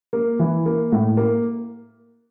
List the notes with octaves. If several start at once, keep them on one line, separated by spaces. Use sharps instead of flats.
A#3
E3
A#3
A2
A#3